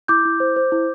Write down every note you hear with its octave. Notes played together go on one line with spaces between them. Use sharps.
E4 D6 G6
E4
C5
C5
E4